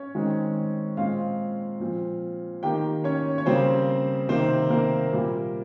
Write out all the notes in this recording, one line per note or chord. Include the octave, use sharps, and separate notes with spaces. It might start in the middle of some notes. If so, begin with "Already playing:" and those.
Already playing: C#4 C#5
D#3 G#3 C4
A#2 G#3 C4 F4 F5
A#2 F3 C4
D#3 A#3 G4 G5
C#4 C#5
C#5
C#3 G3 A#3 C4 C5
C3 D#3 A#3 C4 C5
A#3 A#4
A#2 G3 A#3